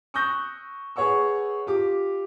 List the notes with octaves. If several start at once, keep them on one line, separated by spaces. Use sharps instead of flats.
C#6 D#6 E6 F#6 G6 A#6
G#4 B4 C#5 F#5 C#6 E6
F4 G4 D6